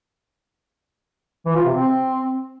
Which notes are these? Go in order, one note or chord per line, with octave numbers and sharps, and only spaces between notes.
E3
F4
C3
C4